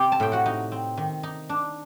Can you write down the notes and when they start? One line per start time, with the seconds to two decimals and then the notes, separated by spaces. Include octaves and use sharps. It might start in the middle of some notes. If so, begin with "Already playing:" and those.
Already playing: C3 C4 G4
0.12 A5
0.20 A2 G5
0.32 F#4 F#5
0.46 D#4
0.72 C4
0.97 D#3
1.23 D#4
1.49 D4